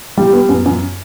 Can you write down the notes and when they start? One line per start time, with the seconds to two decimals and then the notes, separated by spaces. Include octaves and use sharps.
0.17 G3
0.33 B3
0.49 F#2
0.66 F#2